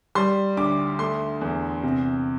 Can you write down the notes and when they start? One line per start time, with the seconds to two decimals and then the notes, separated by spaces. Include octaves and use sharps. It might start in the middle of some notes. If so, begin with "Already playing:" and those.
0.15 G3 C6
0.57 D2 D6
0.99 A3 C6
1.41 E2
1.83 C3